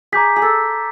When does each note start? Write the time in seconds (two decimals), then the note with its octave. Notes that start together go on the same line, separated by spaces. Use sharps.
0.12 G#4 A#5 D6 G6 B6
0.36 G#4
0.42 A4